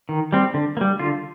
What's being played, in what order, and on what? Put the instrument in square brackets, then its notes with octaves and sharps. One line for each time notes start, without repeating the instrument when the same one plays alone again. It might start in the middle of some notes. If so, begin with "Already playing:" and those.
[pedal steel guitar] D#3
G3 C4
D3
A#3
G3
D3 F4